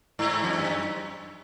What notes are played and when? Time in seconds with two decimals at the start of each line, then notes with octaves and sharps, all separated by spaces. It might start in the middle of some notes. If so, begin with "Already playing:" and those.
0.19 G#2
0.44 F2
0.53 F#2